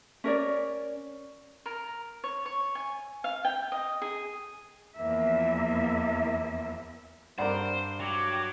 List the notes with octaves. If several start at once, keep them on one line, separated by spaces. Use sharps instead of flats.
C#4 A#4 C#5 D5
A#4
C#5
C#5
G#5
F5
G5
D#5
G#4
E2 F3 A#3 E5
G2 A#4 C5 D5 F#5
F#3 G5 D6